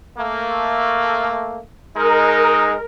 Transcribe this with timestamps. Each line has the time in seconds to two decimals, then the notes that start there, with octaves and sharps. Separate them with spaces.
0.18 A3 A#3
1.97 G#3 D#4 A#4